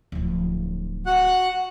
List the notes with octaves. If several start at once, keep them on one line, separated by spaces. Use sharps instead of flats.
D1 F3
F#4 F#5 F#6